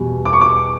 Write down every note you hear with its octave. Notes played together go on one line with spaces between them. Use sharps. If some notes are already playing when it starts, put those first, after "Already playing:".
Already playing: E2 B2 G3
D6
C#6
D6